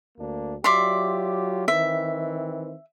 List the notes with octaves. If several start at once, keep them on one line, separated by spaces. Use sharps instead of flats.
D2 A#3 D4
F#3 F4 G4 D5 E5 C6
D#3 E3 C4 E5